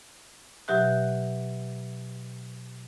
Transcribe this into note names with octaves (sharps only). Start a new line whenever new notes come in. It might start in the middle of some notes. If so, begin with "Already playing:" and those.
B2 F#3 G4 E5 F#6